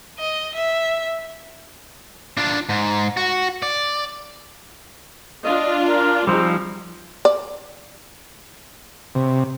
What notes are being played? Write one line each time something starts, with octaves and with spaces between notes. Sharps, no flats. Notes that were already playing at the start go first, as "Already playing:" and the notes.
D#5
E5
D4 F4
G#2
F#4
D5
D4 F4 D#5
A#4
F3 G3 G#3 C4 D#4
D5
C3